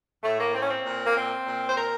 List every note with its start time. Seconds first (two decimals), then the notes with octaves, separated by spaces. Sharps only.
0.23 A2 A3
0.38 A#3
0.54 C4
0.61 C#4
0.68 C4
0.84 A#2
1.05 A#3
1.15 C4
1.46 A#2
1.68 C5
1.77 A#4